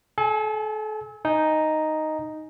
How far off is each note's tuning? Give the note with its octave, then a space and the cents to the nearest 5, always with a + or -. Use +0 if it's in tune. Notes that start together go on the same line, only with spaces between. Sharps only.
A4 -35 G#5 +0
D#4 +0 G#5 +15